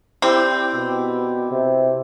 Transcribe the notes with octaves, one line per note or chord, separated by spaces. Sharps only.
C4 E4 G4 D5
B2
C3